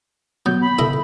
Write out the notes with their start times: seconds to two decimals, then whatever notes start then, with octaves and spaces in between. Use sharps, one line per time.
0.46 F#3 B3 G6
0.61 B5
0.79 C#3 E4 A4 D#5